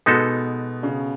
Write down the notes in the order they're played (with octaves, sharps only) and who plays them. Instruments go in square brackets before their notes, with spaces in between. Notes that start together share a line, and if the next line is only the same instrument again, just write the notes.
[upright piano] B2 [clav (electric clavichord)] G#3 B3 D#4 F#4 A4
[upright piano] C#3